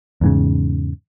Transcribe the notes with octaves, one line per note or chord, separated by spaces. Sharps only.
E2 G#2 C#3